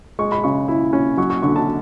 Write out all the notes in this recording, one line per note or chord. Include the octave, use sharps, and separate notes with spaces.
G#3 C#6
B5
C#3 C#6
E4
C#4
F#3 C#6
C#6
D3 C#6
A5